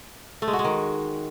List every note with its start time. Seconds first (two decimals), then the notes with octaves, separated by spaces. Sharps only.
0.42 A3
0.48 G#3
0.53 F#4
0.59 G#3
0.65 D#3